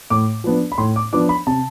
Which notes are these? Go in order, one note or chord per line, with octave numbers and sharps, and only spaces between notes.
A2 D6
F3 B3 D4
B5
A2 C6
D6
F3 B3 D4 D6
B5
C3 A5